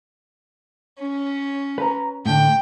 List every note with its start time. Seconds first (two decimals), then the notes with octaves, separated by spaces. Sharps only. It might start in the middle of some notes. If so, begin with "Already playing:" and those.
0.98 C#4
1.78 B4 A#5
2.26 A2 D3 G5